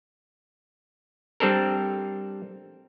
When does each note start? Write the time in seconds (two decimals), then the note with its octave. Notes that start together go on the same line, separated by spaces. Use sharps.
1.40 G3 C4 D4 A4 A#4